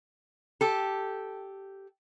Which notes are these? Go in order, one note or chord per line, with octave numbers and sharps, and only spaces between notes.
G4 A4